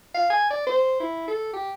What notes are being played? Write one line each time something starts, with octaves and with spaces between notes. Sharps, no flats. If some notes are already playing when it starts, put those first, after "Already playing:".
F5
G#5
D5
C5
E4
A4
G4